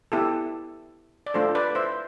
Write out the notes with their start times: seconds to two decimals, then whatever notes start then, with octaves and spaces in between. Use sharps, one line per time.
0.12 B3 E4 G4 A4
1.26 D5
1.34 A3 D4 F4 A4 C5
1.55 B4 D5
1.75 C5 E5